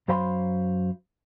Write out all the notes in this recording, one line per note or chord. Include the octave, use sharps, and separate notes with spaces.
F#2 F#3 C5 F5 B5 C6